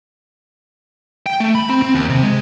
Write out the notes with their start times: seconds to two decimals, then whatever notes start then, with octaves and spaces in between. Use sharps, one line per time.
1.26 G5
1.40 A3
1.55 B5
1.69 C4
1.82 C4
1.95 D#2
2.09 C3
2.23 G#3